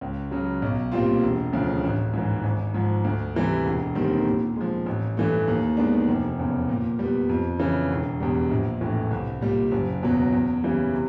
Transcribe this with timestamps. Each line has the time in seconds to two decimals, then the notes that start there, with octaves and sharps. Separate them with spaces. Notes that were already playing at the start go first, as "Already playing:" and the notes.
0.01 C#2
0.31 C#3 F#3
0.62 B1
0.92 A#2 G3 C4 F4
1.23 E1
1.53 D2 C#3 F3
1.83 A1
2.13 G#2 E3
2.44 G#1
2.74 G#2 F3
3.04 D2
3.35 C3 E3 G3
3.66 E1
3.95 D#2 D#3 G3 C4
4.26 A#2
4.56 F3 G#3
4.86 A1
5.17 G2 E3 A3
5.48 D#2
5.77 D#3 G#3 B3 D4
6.08 F1
6.38 E2 C#3
6.69 A#2
6.99 G3 B3
7.29 F2
7.59 C#3 E3
7.90 E1
8.20 E2 B2 G3
8.51 A#1
8.81 A2 E3
9.11 C2
9.41 A#2 G3
9.71 F#1
10.03 E2 B2 F#3
10.32 E2
10.64 C#3 E3 G3
10.94 C3